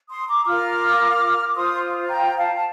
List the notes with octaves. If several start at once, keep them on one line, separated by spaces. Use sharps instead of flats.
C6 D#6
A#5 D6
F4 A#4 D6 F6
D6
F4 C5 C6 D#6
G5 A#5
F5 A5
A5